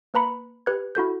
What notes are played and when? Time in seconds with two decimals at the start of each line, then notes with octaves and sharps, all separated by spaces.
0.14 A#3 B4 A#5 B5 C#7
0.66 G4 B4 G#6
0.95 E4 F#4 A4 G6